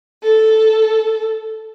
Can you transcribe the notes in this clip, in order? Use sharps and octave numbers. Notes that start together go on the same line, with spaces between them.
A4